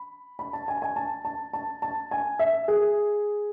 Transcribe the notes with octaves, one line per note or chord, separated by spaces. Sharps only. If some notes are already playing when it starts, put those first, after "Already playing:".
Already playing: B5
B5
A5
G#5
G#5
A5
A5
A5
A5
G#5
E5
G#4